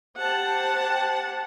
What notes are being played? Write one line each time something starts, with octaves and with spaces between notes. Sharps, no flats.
G4 C5 F#5 A5